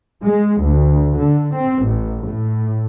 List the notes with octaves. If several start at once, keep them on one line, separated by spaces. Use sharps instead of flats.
G#3
D2
D3
C4
A1
A2